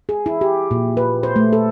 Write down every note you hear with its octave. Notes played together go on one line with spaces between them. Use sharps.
G#4
E4
G4
A#2
B4
C5
A3
A4